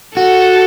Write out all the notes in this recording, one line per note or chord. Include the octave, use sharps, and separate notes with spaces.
F#4 A4